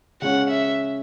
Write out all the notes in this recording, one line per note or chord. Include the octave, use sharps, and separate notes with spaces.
C#3 G#3 C#4 F#5
E5